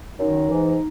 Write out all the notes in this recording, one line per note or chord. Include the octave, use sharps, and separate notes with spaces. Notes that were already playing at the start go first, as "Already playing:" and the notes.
F#2 D#3 D#4
G#2 E3